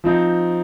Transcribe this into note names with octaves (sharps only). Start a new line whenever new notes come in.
F3 C4 D#4